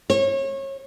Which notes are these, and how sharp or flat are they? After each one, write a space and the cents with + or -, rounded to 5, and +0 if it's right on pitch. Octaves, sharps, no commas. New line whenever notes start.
C#5 -30